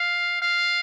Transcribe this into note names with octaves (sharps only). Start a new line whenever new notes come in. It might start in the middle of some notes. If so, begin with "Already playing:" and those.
Already playing: F5
F5